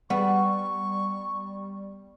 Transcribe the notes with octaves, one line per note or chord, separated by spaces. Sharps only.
G3 B3 C#6